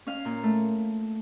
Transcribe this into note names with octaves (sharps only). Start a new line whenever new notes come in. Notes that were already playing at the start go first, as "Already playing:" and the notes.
C#4 F5
A#2
A3